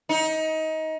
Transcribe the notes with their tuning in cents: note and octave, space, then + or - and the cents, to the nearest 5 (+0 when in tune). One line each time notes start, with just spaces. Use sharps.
D#4 +25